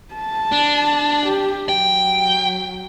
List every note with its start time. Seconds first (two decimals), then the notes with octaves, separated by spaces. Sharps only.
0.14 A5
0.52 D4
1.26 G4
1.69 F#3 G5